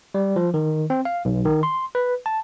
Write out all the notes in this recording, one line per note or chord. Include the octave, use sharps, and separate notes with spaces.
G3
F3
D#3
C4
F5
B1
D#3
C6
B4
A5